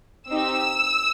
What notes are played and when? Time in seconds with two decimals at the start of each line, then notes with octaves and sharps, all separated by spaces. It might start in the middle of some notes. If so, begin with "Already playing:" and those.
0.28 C4 D#4 G4 E6